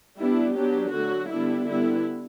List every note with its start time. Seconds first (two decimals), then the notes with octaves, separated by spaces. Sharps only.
0.18 G3 B3 D4 E4
0.55 F#3 B3 D4 G4
0.92 D3 F#3 A3 F#4
1.29 D3 G3 B3 D4 E4
1.67 D3 G3 B3 E4